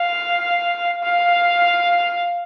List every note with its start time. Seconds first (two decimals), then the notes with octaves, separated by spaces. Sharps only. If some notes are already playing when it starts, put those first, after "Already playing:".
Already playing: F5
1.03 F5